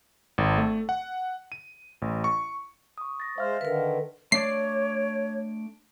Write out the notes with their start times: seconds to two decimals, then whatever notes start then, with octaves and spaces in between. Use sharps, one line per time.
0.38 G#1
0.58 A3
0.89 F#5
1.52 D#7
2.02 A1
2.24 C#6
2.98 C#6 D#6
3.20 A6 A#6
3.38 G#3 C5 E5 F5 F6
3.61 D3 D#3 A#4 B4
4.32 A3 D4 C#5 D5 C7